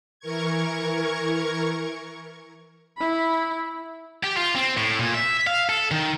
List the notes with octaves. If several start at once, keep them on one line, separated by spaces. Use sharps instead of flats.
E3 A#4 C#6 G#6
E4 B5
G4
F4
C4
A2
A#2
E5
F5
A4
D#3